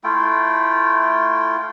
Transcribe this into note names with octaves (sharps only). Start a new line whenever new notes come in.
A3 E4 F4 G5